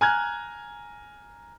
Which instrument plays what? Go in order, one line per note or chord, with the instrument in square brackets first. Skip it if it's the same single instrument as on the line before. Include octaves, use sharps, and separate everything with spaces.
[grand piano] G#5 A#5 F6 F#6 G#6